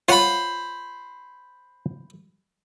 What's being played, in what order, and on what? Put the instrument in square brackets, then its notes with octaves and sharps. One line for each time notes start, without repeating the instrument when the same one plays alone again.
[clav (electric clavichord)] F4 C#5 F#5 [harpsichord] C5 B5